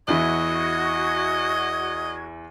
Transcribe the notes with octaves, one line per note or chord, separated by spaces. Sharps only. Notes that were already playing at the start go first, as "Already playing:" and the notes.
E2 E4 F#4 D#5 C#6 G#6